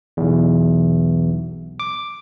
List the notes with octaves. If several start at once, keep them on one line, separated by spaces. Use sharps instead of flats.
B1 E2
D6